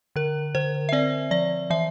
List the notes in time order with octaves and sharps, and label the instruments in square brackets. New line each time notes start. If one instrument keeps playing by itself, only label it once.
[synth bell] D3 A#4
D3 C5
E5
C4 D5
F3 D5
E3 E5